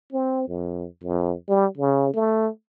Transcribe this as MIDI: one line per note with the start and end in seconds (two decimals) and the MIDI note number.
0.13 0.46 60
0.48 0.86 41
1.03 1.34 41
1.48 1.67 55
1.78 2.14 49
2.14 2.48 57